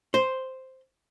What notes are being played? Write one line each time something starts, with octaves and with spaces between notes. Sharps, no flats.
C5